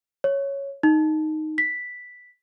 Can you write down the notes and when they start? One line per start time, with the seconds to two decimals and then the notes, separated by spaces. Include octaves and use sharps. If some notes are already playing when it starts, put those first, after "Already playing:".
0.24 C#5
0.83 D#4
1.58 B6